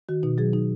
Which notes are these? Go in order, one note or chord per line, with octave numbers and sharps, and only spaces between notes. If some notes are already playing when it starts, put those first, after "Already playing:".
D#3 F#4
B2 D#4
F#3 G#4
D#4